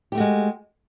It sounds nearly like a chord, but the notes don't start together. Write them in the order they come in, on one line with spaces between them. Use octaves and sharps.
G4 A3 F#4 G#3